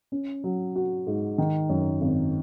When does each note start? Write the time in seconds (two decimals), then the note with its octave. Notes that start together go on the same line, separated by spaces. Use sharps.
0.12 C#4
0.44 F#3
0.76 F#4
1.07 G#2
1.38 D#3
1.69 F#2
2.01 G#1